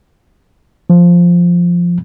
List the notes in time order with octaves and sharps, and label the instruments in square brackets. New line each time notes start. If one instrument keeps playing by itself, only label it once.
[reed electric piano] F3